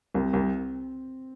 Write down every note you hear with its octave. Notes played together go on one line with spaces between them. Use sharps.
C2 C4
C2